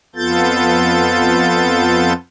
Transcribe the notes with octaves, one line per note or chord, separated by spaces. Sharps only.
F2 B3 F4 A4 G6 A6